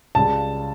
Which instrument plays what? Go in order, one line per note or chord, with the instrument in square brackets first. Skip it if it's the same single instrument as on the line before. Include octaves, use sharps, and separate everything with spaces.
[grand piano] C#2 C#3 G3 A5